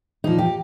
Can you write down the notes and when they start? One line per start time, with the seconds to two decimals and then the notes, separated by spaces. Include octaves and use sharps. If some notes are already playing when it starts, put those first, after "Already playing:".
0.24 A#2 F3 D#4
0.38 G4